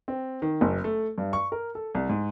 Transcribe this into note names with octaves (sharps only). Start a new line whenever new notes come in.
C4
D#3
F#1
A3
G2
C#6
A#4
A4
C2
G#2